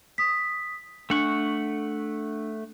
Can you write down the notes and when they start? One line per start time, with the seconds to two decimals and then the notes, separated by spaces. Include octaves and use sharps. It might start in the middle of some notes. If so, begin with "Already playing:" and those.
0.18 D#6 B6
1.10 A3 D4 F#5 C#6